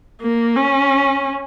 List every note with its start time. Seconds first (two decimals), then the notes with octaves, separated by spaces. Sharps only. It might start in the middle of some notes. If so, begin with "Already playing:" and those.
0.22 A#3
0.56 C#4